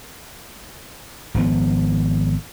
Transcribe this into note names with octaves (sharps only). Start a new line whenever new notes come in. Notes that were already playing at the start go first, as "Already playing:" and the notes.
G#1 F3 B3